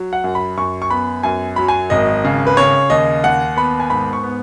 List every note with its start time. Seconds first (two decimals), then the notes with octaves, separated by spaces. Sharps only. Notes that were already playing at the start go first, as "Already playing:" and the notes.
Already playing: F#3
0.13 F#5
0.24 F#2
0.35 B5
0.57 F#2 C#6
0.82 C#6
0.90 B3 B5
1.23 F#2 G#5
1.56 F#3 B5
1.68 G#5
1.90 G#1 D#5
2.24 C#3
2.47 B4
2.57 C#3 C#5
2.90 D#2 D#5
3.24 D#2 F#5
3.57 B3 B5
3.80 G#5
3.90 G#2 B5
4.13 C#6
4.23 B3